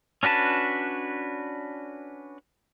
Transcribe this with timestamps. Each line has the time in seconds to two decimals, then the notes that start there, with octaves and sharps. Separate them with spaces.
0.23 C#4 D4 F#4 B4 A5